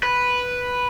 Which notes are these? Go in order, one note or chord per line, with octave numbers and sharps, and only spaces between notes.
B4